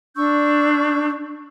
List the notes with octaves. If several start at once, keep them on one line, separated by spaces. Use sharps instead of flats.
D4 C#6 E6 G6